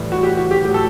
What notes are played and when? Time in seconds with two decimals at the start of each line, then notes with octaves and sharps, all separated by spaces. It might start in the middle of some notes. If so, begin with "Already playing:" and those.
Already playing: A2 E3 G3
0.12 F#4
0.23 G4
0.37 F#4
0.51 G4
0.65 A2 F#3 G4
0.74 A4